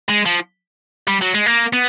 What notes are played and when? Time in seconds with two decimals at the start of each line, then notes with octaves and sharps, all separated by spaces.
0.09 G#3
0.26 F3
1.08 G3
1.21 F#3
1.35 G#3
1.46 A#3
1.73 B3